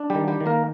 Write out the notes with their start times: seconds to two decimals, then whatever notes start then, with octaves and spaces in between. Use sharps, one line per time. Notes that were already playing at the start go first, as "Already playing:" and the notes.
Already playing: D4
0.10 G3 G4
0.15 D#3
0.27 G3 G4
0.40 D#3
0.46 A#3 A#4